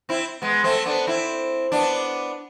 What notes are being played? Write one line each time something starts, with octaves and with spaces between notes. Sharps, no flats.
C4 E4
G#3 B3
A3 C4
B3 D4
C4 E4
B3 D4